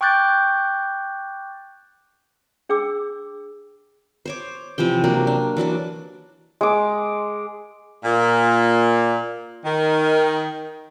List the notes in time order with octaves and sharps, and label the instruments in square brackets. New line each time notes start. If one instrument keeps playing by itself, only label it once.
[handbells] G5 C#6 D6 F#6 G6 A6
[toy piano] D4 G#4 G5 D6 E6
[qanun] C5 C#5 D6
C3 E3 F3 G5
C3 F#3 A#3 D4
D4
E3 F#3 D4 D6
[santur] G#3 D6
[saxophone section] A#2
D#3